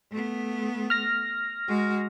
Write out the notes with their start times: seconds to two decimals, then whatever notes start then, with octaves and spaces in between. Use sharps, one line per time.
0.11 A3 B3
0.90 F6 A#6
1.68 G#3 F#4